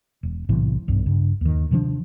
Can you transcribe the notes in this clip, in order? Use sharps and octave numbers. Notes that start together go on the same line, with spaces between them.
E1
B1 A2 C3 E3
B1 G2
G2 C#3
D#2 D#3
C3 D#3 F3 D4